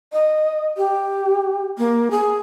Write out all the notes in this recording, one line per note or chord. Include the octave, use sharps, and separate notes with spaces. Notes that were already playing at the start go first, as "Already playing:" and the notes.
D#5
G4
A#3
G#4